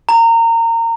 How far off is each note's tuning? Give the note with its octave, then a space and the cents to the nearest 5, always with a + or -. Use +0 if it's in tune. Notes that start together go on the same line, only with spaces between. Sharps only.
A#5 -25